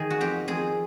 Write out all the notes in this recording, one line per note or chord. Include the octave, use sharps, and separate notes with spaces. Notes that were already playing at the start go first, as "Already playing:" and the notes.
Already playing: D#3 G#4
F#4
F2 G4
F2 G#4